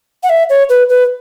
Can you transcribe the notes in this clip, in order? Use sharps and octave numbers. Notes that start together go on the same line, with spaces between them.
F#5
E5
C#5
B4
B4